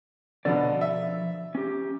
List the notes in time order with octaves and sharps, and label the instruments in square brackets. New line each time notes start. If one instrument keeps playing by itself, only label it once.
[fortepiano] B2 D3 [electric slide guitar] F3 D5
[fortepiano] E5
[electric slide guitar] C#4 G4